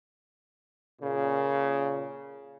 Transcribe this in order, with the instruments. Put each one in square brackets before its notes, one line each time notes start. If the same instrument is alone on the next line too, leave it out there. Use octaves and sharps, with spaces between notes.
[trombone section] A#2 C#3